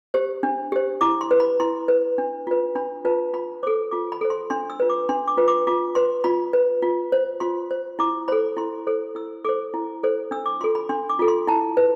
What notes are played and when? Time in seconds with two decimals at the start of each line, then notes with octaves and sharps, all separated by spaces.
0.14 G4 C5
0.43 D4
0.72 G4 C5
1.01 E4 D6
1.21 C6
1.31 B4
1.40 B5
1.60 E4 C6
1.88 B4
2.18 D4
2.47 F4 B4
2.75 D4 B5
3.05 F4 B4 A5
3.34 F4 B5
3.63 A4 C5 D6
3.91 F4 D6
4.12 B5
4.21 A4 C5
4.30 C6
4.50 D4 C6
4.70 E6
4.80 F4 B4
4.90 D6
5.09 D4 C6
5.28 D6
5.37 F4 B4
5.48 D6
5.67 F4 D6
5.95 B4 C6
6.24 F4 B5
6.53 B4
6.82 F4
7.12 C5
7.40 F4 C6
7.71 C5
7.99 E4 D6
8.28 A4 C5 B5
8.57 E4 C6
8.87 A4 C5
9.15 E4 E6
9.45 A4 C5 D6
9.74 E4
10.03 A4 C5
10.31 D4 E6
10.46 D6
10.61 F4 A4 C6
10.75 B5
10.89 D4 C6
11.09 D6
11.19 F4 A4
11.28 C6
11.47 E4 A5
11.77 B4